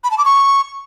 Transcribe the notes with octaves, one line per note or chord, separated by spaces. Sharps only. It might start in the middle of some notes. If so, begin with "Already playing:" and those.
B5
A5
D6
C#6